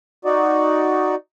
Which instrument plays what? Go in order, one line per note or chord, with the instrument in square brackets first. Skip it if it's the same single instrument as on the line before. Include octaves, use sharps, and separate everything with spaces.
[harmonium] D#4 F#4 D5